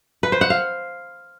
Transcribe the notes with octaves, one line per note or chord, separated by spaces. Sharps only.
B4
C5
F#5
F5